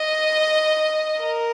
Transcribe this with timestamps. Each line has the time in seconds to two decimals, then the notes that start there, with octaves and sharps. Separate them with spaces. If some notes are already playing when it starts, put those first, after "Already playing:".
Already playing: D#5
1.21 A#4